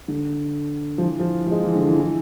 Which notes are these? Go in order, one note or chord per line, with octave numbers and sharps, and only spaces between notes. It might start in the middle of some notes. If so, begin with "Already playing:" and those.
D3
F3
E3
F3
F3
G#3
E3
D3
E3
E3